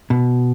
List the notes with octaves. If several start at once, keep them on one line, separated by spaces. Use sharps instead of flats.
B2